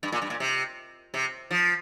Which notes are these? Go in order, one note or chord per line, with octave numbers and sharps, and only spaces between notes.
G2
A#2
G2
A#2
C3
C3
F3